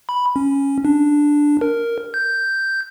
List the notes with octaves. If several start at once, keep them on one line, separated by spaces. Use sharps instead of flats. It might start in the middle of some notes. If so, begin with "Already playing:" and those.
B5
C#4
D4
A#4
G6